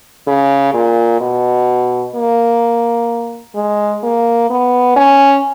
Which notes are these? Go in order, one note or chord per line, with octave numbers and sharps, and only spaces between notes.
C#3
A#2
B2
A#3
G#3
A#3
B3
C#4